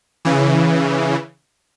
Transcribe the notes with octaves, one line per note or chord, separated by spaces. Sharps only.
C#3 E3